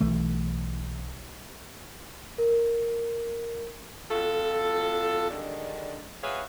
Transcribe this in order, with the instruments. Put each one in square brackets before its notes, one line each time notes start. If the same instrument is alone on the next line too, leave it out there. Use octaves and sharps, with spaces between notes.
[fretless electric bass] B1 E3 A3
[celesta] A#4
[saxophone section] F2 F4 F#4 A4
D3 D#3 G3 G#3 D4
F#4 G#4 B4 C#5 E5 F5